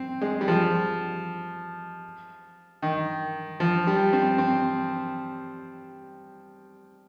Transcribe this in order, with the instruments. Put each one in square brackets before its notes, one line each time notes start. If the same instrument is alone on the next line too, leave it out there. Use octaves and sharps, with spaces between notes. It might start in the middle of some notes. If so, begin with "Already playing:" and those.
Already playing: [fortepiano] C4
G#3
G3
F3
D#3
F3
G3
C4
C4